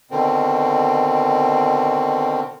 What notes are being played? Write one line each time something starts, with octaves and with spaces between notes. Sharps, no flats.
B2 D3 D#3 C4